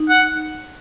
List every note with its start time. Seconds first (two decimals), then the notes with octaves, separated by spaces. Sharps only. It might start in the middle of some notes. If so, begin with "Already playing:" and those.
Already playing: D#4
0.09 F#5